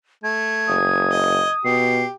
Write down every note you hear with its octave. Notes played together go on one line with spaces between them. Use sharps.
A3 G#6
F#1 D#6
D#5
B2 G4 C7